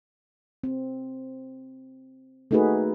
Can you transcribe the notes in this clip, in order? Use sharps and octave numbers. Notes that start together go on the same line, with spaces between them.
C4
A3 A#3 D#4 F#4 G#4 B4